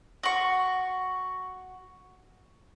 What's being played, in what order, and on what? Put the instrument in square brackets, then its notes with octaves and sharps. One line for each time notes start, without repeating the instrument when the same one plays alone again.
[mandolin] F#4 C#6